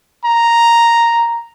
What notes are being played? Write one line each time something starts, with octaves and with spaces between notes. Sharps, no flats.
A#5